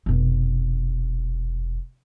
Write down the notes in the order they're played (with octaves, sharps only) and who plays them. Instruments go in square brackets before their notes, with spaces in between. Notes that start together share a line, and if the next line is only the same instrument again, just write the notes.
[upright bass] F1 B2